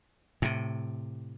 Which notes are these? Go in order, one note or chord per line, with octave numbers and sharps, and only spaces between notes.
A2 C3